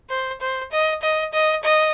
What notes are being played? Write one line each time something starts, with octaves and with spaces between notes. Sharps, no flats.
C5
C5
D#5
D#5
D#5
D#5